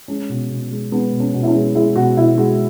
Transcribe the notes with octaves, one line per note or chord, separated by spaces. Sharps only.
G#3 C#4
B2
B2
G#3
G#3 B3
B2
C#4
B2
E4
C#4
G#3
G#3 E4
B2 F#4
B2 E4
G#3 F#4